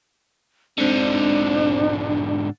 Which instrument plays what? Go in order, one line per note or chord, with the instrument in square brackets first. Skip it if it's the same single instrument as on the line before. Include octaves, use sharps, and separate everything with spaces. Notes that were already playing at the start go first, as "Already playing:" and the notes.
[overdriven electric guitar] G#2 D3 [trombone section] C4 [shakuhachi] D4